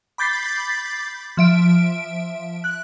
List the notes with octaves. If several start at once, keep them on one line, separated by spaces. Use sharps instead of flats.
B5 D6 G6 A6 B6 C7
F3 E5 D7
F#6